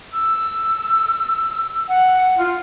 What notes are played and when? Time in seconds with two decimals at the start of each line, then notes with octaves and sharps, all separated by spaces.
0.12 E6
1.89 F#5
2.36 F4